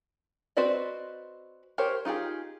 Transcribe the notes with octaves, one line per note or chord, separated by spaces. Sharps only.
C4 F#4 B4 D5 D#5
G4 A#4 C5 C#5
D#4 F4 G4 G#4